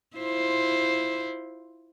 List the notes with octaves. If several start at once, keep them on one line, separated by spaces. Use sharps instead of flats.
E4 F4 C5